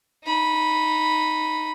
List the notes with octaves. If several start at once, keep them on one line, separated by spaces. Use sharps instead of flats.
D#4 B5